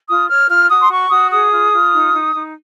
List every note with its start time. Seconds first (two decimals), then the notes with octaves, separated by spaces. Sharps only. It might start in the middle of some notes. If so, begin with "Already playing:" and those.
0.09 F4 D#6
0.29 C#5 F6
0.49 F4 F6
0.70 F#4 D#6
0.81 C6
0.90 F#4 C#6
1.10 F#4 D#6
1.31 G#4 D#6
1.52 F4
1.72 F4
1.93 D#4
2.13 D#4
2.33 D#4